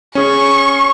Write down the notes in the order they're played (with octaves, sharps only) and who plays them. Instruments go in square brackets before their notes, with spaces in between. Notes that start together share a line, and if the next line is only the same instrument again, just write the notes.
[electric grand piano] C#4 G#4 [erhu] C#6